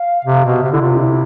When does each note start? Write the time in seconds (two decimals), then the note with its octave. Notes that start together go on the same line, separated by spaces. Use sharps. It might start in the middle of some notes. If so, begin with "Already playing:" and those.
Already playing: F5
0.25 C3
0.45 B2
0.63 C3
0.72 D3 E4
0.81 C3 F4
0.97 D4
1.03 E4